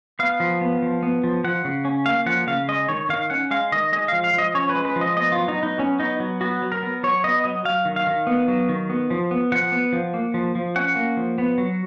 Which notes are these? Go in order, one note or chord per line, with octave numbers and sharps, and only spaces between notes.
B3 F5
F3
B3
F3
B3
F3
F3 F#5
C#3
C#4
A#3 F5
F3 F#5
C#3 F5
G#3 D#5
D#3 C#5
D#3 F5
C#4 F#5
G#3 F5
D#3 D#5
G#3 D#5
F3 F5
F5
F3
D#5
C#4 C#5
B4
G#3
B4
F3
D#5
B3 D#5
F#3 F4
D#4
B3
D#4
F#3 C#4
B3 D#4
F#3
B3 F#4
F#3
A#4
B3
F#3 C#5
B3 D#5
F#3 D#5
F#3 F5
D#3
F5
D#3
B3
F#3
D#3
B3
F3
B3
F3 F#5
B3
F3
A#3
F3
F3
C#4 F#5
A#3
F3
B3
F#3